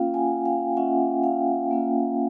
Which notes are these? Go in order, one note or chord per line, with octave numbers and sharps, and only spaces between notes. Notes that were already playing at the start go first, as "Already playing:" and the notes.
Already playing: A#3 C#4 F4 F5 G5
F#5 G#5
F5 G5
A#3 C#4 F4 E5 F#5
F5 G5
A#3 C#4 F4